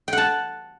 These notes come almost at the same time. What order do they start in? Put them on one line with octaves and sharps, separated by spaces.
G5 F#5 A5